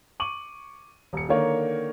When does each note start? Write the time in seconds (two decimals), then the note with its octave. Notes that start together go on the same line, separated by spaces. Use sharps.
0.20 C#6 D6 D#7 F#7
1.13 D#1 C#7
1.29 D3 D#3 A#3 C#5